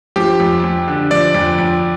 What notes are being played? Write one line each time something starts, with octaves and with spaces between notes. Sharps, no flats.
F3 G4
F2
F2
D3
F3 D5
F2
F2